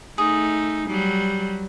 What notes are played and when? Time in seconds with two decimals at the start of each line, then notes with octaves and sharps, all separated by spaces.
0.18 A3 D#4 G#4
0.88 F#3 G3